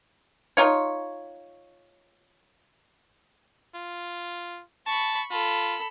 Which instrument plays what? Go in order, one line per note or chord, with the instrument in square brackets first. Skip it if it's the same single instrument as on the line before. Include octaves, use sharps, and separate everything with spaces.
[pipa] D#4 F4 C#5
[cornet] F4
[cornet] A5 [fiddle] B5 C#6
[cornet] F4 [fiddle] A4 B5